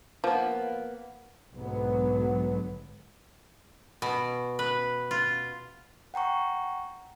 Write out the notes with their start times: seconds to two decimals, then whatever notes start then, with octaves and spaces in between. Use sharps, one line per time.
0.24 F3 A#3 B3
1.53 B1 G#2 D3 F#3 B3
4.02 B2
4.59 B4
5.11 F4
6.14 F#5 G5 A#5 C#6